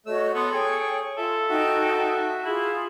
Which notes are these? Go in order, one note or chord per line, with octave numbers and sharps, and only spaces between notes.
A3 F#4 C#5 D#5 E6
B3 A4 C6 C#6 D#6
G#4 C#5 G5
F4 A4 E5
D#4 F#4 E5 G5
E4 F4 G#4